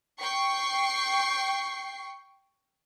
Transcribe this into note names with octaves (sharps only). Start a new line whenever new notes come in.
G5 C#6 C7